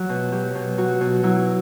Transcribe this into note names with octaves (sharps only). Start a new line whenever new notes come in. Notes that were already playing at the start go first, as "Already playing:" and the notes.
Already playing: F#3 F#4
B2
F#3 G4
B2
F#3 F#4
B2
F#3 E4